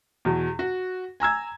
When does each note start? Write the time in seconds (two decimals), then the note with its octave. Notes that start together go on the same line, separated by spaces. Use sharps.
0.25 E2 B2
0.59 F#4
1.20 G#5 A#5 E6 G#6